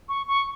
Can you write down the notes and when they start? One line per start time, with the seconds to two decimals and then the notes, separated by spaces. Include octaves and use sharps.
0.09 C#6
0.28 C#6